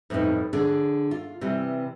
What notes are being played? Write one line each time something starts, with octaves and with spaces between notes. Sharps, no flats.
F2 A2 G3 B3 D#4
D3 D4 G#4
F4
C3 E3 G3